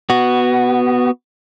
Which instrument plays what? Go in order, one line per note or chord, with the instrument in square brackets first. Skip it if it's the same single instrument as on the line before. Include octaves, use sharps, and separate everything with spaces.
[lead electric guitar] B3 F#4